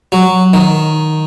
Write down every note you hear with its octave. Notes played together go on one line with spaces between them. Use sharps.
F#3
D#3